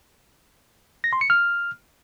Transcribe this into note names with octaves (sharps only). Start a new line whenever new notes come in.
A#6
C6
C#7
F6